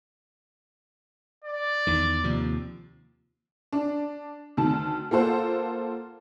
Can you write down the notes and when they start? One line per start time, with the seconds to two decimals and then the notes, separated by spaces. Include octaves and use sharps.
1.44 D5
1.87 E2 D#3
2.24 D#2 C3 F3
3.72 D4
4.57 D2 D#3 A5
5.11 A#3 F4 A4 C5 F#5